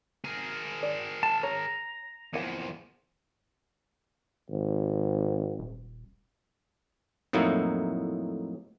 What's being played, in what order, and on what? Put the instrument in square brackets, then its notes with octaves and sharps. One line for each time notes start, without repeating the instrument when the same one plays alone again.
[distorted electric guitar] G#4 A#4
[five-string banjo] D5
[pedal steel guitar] A5
[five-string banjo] C#5 [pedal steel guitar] A#5
[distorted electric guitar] E2 F3 [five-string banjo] A#3 F#5
[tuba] G#1
[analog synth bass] D#1
[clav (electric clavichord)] F2 A2 F#3 A#3 D#4 E4